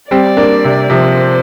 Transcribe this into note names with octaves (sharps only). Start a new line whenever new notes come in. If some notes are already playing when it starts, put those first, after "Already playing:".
G3 C4 D5
A#3 D4
C3
C3 F3 C5